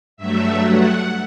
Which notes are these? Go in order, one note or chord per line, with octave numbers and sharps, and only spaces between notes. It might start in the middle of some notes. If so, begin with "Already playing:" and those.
G2 F#3 A3 E5
F#5